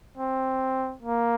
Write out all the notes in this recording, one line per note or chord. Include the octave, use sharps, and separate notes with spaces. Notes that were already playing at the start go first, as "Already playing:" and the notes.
C4
A#3